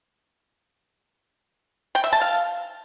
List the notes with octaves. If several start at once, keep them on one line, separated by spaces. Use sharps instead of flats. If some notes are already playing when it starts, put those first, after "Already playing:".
G5
E5
A5
F5